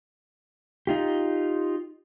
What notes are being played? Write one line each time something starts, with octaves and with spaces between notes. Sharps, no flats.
D#4 F4 G4